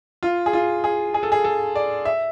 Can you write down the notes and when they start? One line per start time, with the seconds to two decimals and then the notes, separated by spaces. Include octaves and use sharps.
0.23 F4
0.46 G#4
0.53 F4
0.84 G#4
1.14 G#4
1.23 A4
1.32 G#4
1.44 A4
1.75 D5
2.05 E5